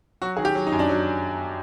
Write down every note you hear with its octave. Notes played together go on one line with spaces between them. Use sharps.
F#3 F#4
D#3 G#4
G4
F#3
D#4
F#2
D4
F#3